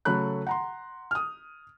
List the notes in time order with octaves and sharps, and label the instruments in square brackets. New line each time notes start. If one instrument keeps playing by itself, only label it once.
[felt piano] C#3 F#3 A3 A4 B5 F#6
F#5 A#5 C6
D#6 F6